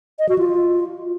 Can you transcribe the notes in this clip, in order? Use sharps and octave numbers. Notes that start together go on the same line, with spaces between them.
D#5
F#4
F4